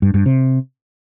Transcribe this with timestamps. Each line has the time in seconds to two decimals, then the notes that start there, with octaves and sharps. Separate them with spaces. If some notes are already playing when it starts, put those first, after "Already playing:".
0.02 G2
0.14 G2
0.26 C3